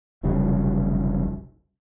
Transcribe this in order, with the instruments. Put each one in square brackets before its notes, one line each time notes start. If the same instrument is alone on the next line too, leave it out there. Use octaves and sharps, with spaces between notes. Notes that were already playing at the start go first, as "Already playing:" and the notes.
[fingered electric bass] F1 B1 C#3 G3